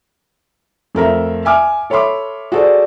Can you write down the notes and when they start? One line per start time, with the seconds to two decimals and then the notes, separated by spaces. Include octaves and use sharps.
0.95 F2 A3 A#4 E5
1.45 E5 G#5 D6 F6
1.90 A4 C#5 E5 B5 C6 D6
2.52 F#4 G#4 A4 C5 D5